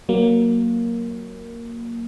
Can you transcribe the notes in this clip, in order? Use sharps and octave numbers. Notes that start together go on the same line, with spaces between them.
F#3 A#3